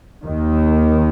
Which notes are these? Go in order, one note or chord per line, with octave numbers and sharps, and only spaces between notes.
D#2 D#3